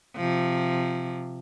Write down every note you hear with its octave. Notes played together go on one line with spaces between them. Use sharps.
C3 F3